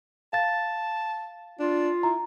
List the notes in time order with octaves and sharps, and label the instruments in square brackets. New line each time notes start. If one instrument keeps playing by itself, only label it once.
[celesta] F5 A6 [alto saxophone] A5
[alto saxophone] D4 [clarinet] F4
[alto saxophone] E4 [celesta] A#5